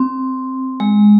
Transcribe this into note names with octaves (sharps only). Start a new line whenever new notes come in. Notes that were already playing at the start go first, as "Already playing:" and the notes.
Already playing: C4
G#3